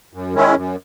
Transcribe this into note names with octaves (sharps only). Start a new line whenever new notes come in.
F#2
D#3 G#3 C#4 E4
F#2